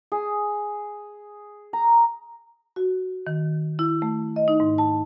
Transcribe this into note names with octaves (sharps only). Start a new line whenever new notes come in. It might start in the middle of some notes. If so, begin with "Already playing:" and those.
G#4
A#5
F#4
D#3
E4
A3
D#5
D#4
G#2
A5